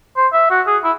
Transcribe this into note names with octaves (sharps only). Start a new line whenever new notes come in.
C5
E5
F#4
G#4
E4